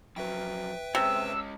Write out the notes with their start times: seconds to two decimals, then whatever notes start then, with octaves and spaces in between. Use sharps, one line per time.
0.16 F2 F#3 B4 E5 G5
0.95 C3 G#3 C#4 E6